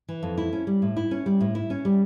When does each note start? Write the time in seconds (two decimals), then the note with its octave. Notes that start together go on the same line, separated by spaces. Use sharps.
0.08 E3
0.23 F2
0.38 E4
0.53 C#4
0.67 G3
0.82 A2
0.96 E4
1.11 C#4
1.26 G3
1.41 A2
1.55 E4
1.70 C#4
1.85 G3